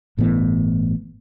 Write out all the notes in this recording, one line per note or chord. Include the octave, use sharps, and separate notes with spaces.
G1 A2 E3 B3